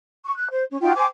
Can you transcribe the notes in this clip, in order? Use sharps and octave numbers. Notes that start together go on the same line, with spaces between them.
C#6
F#6
C5
C#4
D#4 F4 F#4 G5
C5 G5 G#5 D6